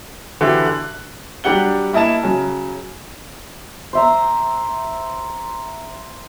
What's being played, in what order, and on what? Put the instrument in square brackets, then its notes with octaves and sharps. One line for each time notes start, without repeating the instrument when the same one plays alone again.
[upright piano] D3 E3 E4 F#4 G4
F#6
F#3 G3 D4 G4 F#5 G7
A#3 E4 D#5 A5 E7
C#3 F#3
[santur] C5 E5 A#5